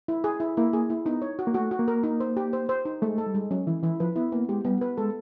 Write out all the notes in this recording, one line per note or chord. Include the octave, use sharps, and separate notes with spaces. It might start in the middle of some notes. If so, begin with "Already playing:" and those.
E4
G#4
E4
A#3 E4
G#4
E4
B3 D#4
C#5
F#4
A#3
A3 F#4
F#4
A#3
A#4
D#4
C5
G4
C5
C5
D#4
G#3 A3
A4
G3
G#3
F#3 C#4
E3 E4
E3 E4
F3 B4
B3 E4
A#3 B3
G#3 G4
G3 B3
B4
G#3 A4